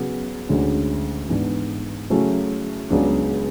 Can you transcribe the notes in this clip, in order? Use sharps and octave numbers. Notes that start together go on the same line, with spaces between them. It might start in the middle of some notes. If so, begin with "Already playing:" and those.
Already playing: C#3 F#3 B3
D2 D3 G#3 C#4
G#2 E3 B3 D4
C#3 F#3 A3 C#4 E4
C#2 C#3 F#3 B3 D4